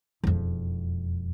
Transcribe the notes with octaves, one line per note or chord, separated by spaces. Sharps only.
E1 F2